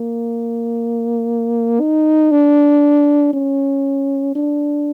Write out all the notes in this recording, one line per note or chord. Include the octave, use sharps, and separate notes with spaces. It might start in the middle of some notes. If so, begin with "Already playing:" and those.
Already playing: A#3
D#4
D4
C#4
D4